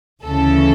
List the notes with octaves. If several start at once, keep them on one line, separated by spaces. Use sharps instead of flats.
D2 C#3 E3 A4